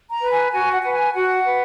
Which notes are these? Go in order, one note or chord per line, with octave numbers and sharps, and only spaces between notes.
A#5
B4
G#5
F#4 G#5
F#5
B4 F#5
G#5
F#4 F#5
B4